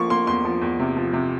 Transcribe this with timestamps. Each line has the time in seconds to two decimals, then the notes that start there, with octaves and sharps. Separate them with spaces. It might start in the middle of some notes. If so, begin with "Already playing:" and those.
Already playing: F3 A#3 C6 C#6
0.10 A#3 C6
0.27 E2 C6
0.45 F3
0.62 E2
0.79 C3
0.97 F3
1.13 C3